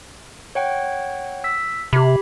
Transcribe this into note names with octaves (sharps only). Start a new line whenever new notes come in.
C#5 F#5 G5
E6 B6
C3 G4 B5